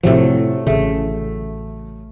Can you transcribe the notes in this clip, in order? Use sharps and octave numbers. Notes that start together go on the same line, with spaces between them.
A2 C3 F3 F#3 A3
A1 C#3 A3